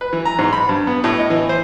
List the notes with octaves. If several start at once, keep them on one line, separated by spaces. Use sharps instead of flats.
B4
E3
A#5
G#2
B5
G2
B3
A2
D#5
E3
C5